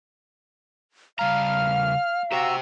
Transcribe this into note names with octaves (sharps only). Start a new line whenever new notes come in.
C#3 G3 F5 A#5 F6
F#4 G4 C5 G5 A#5 E6